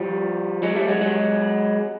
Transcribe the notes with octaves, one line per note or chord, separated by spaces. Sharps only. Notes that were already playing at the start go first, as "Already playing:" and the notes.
Already playing: F3 G3
F#3 G#3
G3 A3
F#3 G#3
F#3 G#3